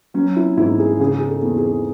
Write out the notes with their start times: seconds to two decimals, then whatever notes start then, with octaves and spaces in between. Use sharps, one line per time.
0.14 F#3 C#4
0.36 E4
0.57 G#2 E4
0.79 G#4
1.00 C#3 G#4
1.20 G#4
1.28 A4
1.42 E2
1.57 G#4